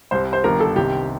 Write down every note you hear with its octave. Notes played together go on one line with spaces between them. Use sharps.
C2 C3 G3 C5
C5
G1 G2 D#3 A#4
A4
C2 C3 D#3 G4